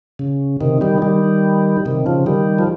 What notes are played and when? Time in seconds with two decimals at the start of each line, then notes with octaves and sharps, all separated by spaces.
0.19 C#3
0.61 C3 D#3
0.81 D#3 G3
1.02 D#3 G3
1.85 C3 D#3
2.06 C#3 F3
2.26 D#3 G3
2.59 F3